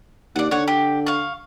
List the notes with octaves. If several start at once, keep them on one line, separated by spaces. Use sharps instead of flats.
D#2 D5 F#5
D3 C#5 F#5
G4
F5 C#6